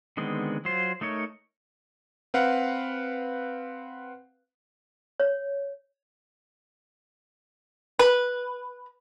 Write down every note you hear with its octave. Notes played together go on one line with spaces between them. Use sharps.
D3 D#3 G#3 B3 C4
F#3 F4 C5
A3 D#4 A#4 C#5
C4 B4 F5 F#5
C#5
B4